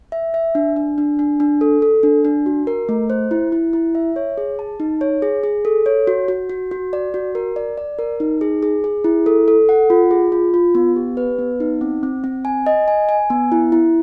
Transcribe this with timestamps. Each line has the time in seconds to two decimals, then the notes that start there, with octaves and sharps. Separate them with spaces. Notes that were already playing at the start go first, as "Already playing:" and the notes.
0.12 E5
0.34 E5
0.55 D4
0.76 D4
0.98 D4
1.19 D4
1.40 D4
1.61 A4
1.82 A4
2.03 D4
2.25 D4
2.46 F#4
2.67 A#4
2.89 A3
3.10 C5
3.31 E4
3.52 E4
3.73 E4
3.95 E5
4.16 C#5
4.38 G#4
4.59 A5
4.80 D#4
5.01 C#5
5.22 G#4
5.44 G#4
5.65 A4
5.86 C#5
6.07 F#4
6.28 F#4
6.50 F#4
6.71 F#4
6.93 D5
7.14 F#4
7.35 A#4
7.56 D5
7.78 D5
7.99 A#4
8.20 D#4
8.41 G#4
8.63 G#4
8.84 G#4
9.04 E4
9.26 A4
9.48 A4
9.69 F#5
9.90 F4
10.11 G#4
10.32 F4
10.54 F4
10.75 B3
10.96 G4
11.17 B4
11.39 B3
11.60 D#4
11.81 C4
12.03 C4
12.24 C4
12.45 G#5
12.66 D#5
12.88 G#5
13.09 G#5
13.30 B3
13.52 E4
13.72 E4